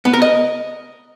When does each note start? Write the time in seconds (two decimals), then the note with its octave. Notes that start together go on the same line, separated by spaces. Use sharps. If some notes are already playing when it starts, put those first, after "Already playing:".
0.05 B3
0.13 A#4
0.22 D#5